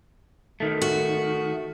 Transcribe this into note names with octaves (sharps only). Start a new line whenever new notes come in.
D#3 A3
F#4